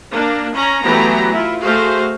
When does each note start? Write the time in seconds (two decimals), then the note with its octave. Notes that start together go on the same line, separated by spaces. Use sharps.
0.11 A#3 D4
0.55 C#4 A#5
0.84 E3 F#3 A3 B3 G4 A#5
1.32 E4 F4
1.62 A3 F#4 G#4 C5 F5